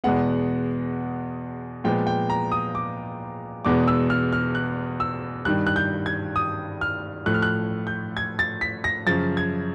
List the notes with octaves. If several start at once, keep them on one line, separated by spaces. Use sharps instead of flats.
E2 B2 G#3 B3 F#5
A#2 F3 G#3 B3 G5
G5
A#5
D#6
D6
E2 B2 G#3 B3 D6
E6
F6
F6
F#6
E6
G2 D#3 G3 F#6
F#6
G6
G#6
D#6
F6
A2 F3 A3 F#6
F6
F#6
G6
G#6
A6
B6
A#6
F#2 C#3 F3 A6
G#6